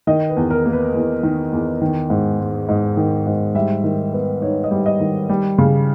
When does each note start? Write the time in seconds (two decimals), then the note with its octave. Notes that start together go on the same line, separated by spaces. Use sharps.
0.07 D#3 D#5
0.29 B4
0.37 E2
0.50 A#4
0.66 A#3
0.73 B4
0.95 E2
1.23 D#3
1.52 E2
1.82 D#3
2.10 G#2
2.40 G#3
2.68 G#2 D#5
2.97 D#3
3.27 G#2
3.55 G3 E5
3.84 D#3
4.13 B3
4.42 D#4 C#5
4.64 D#5
4.71 G3
4.86 D#5
5.00 D#3
5.29 G3
5.58 C#3